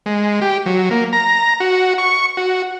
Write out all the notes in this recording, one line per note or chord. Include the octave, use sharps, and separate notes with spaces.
G#3
G4
F#3
A#3
A#5
F#4
C#6
F#4